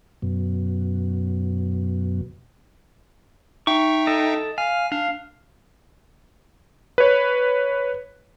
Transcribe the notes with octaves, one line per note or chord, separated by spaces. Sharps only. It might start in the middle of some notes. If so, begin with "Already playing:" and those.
F#2 B2
D#4 E5 G5 C#6
A4 D#5
F5 G#5
D4 F5
B4 C#5